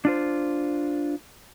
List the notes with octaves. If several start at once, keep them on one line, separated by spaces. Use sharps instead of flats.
D4 F4 C5